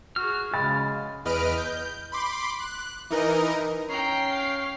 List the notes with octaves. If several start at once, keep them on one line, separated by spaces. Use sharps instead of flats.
F#4 G#4 F6
C#3 G#3 B5 A6
E2 B4 D#5 F6 D7
G6
B5 C6 D6
F#6
E3 D#4 A#4 D#5
C#4 G5 A#5 C7
F5